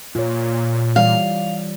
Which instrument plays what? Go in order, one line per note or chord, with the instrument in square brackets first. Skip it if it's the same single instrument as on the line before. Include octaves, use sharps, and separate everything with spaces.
[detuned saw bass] A#2 [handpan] F4 C#5
[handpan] E3 G3 D5 [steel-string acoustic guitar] F5